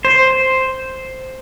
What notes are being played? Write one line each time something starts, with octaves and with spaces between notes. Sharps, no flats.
C5